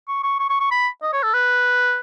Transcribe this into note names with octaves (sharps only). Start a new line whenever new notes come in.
C#6
C#6
C#6
C#6
C#6
B5
D#5
C#5
A4
B4